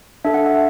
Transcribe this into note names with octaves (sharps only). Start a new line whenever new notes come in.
D4 A4 E5
F#5
E5